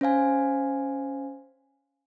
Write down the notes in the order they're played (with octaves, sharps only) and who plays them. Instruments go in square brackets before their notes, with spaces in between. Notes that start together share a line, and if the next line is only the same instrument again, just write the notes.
[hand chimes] C#4 C5 F5 G#5